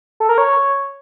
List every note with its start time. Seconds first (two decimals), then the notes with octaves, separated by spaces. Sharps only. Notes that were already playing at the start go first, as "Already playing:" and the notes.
0.20 A4
0.29 A#4
0.38 C#5